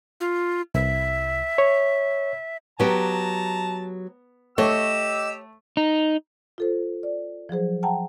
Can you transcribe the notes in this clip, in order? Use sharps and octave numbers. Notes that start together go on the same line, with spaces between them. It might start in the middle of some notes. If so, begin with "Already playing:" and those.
F4
C2 E5
C#5
F#3 B3 G4 A5 A#5
A3 G4 C#5 D#5 E6
D#4
F4 A4 C5
D5
F3 F#3 G#4 C5
F#5 G5 A5 A#5